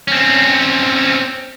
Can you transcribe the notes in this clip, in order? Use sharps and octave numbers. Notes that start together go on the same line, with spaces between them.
C4 C#4